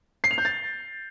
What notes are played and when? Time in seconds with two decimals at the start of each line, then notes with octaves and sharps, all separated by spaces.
0.24 C7
0.31 F7
0.38 G6
0.45 A6